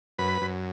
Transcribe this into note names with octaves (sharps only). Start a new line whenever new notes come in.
F#2 B4 B5
F#2